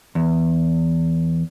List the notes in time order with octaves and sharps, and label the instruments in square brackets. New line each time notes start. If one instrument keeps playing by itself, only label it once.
[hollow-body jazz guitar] E2